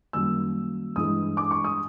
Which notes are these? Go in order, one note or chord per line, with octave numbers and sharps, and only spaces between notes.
F#2 D#3 G3 A#3 E6
G2 E3 G#3 D#6
D6
C#6
D#6